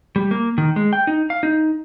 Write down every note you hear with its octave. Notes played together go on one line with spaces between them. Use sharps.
G3
A#3
D#3
G#3
G5
D#4
F5
D#4